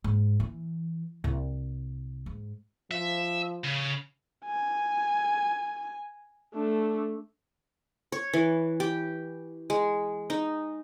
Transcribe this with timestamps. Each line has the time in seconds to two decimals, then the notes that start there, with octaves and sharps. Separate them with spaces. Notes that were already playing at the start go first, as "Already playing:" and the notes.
0.04 G#2
0.40 E3
1.24 C2
2.26 G#2
2.91 F3 E5
3.64 C#3
4.46 G#5
6.55 A3 D4
8.12 C#5
8.33 E3
8.80 G4
9.70 G#3
10.30 D#4